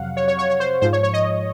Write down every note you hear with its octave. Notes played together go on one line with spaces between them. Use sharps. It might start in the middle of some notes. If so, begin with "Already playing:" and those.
Already playing: F2 C3 F#3 F5 F#5
C#5
C#5
C#5
C#5
C5
G#2 F3 C5
C#5
C#5
D#5